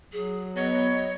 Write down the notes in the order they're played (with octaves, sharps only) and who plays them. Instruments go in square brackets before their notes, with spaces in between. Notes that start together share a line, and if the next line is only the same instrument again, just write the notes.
[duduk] F#3 [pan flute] G#4
[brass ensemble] B3 [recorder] C#5 [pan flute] D#5